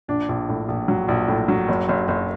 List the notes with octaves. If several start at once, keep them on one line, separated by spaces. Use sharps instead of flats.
A#1 D4
A#1
A2
A#1
F#3
A#1
A2
F#3
F#1
F#1
F#1